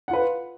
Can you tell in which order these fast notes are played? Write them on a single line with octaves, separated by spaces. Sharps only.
F#5 F4 B4